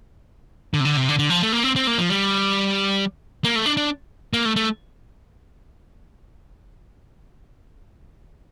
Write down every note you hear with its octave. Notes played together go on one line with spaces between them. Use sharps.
D3
C3
D3
C3
D3
D3
F3
A3
A#3
C4
C4
A#3
F3
G3
A#3
A3
D4
D4
A#3
A3
A3